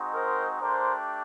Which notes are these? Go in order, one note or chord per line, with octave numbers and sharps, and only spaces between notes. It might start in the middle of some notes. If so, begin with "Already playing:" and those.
Already playing: G#3 C4 D#4 F#4
A#4 C5
A3 D4 G4 A#4 C5